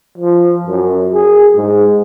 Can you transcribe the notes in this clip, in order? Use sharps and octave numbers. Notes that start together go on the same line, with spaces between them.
F3
F#2
G#4
G#2